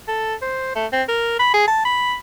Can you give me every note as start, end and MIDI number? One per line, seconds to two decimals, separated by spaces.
0.08 0.35 69
0.42 0.72 72
0.76 0.86 57
0.93 1.03 60
1.09 1.38 70
1.39 1.50 83
1.54 1.68 68
1.68 1.81 81
1.85 2.16 83